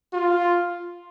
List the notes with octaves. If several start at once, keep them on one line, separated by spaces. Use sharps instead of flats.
F4